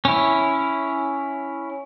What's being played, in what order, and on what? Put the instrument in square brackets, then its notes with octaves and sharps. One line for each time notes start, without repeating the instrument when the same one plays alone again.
[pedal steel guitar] C#4 E4